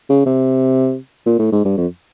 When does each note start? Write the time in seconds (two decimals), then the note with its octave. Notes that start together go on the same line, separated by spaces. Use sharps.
0.09 C#3
0.26 C3
1.26 A#2
1.39 A2
1.52 G#2
1.65 G2
1.77 F2